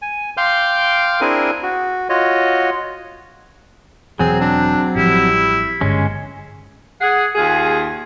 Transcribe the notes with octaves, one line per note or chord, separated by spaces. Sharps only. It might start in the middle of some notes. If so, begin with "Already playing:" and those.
G#5
F5 G5 C6 D6 F6 G6
C4 D4 E4 G#4 A#4 G#5
F#4
F4 F#4 C#5 D#5
E1 E3 F#3 C4 G#4
D4
A1 F3 G3 E4
G#1 G2 D3 G#3 C#4
G#4 F#5
D#2 F4 G#4